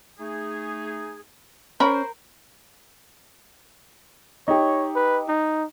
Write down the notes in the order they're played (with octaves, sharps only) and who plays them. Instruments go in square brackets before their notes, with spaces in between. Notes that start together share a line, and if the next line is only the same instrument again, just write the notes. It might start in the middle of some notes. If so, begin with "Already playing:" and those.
[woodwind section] A3 D#4 G#4
[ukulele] C#4 [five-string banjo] A#4 B5 [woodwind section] C5
[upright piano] D#4 G4 [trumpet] C#5
[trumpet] B4
D#4